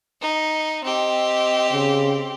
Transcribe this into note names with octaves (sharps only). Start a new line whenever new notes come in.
D#4
C4 G4 D#5
C#3